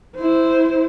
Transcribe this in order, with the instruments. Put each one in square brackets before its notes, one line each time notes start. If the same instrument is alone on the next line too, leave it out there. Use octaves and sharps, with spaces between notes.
[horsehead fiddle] E4 C5